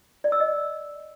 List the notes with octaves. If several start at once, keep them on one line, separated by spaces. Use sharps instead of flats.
D5
E6
D#5